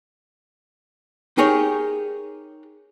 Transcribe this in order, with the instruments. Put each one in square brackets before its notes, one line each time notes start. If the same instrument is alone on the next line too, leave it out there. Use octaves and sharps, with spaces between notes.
[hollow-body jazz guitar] D#4 G4 G#4 A#4 C#5